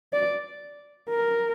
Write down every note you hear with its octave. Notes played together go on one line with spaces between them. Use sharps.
D5
A#4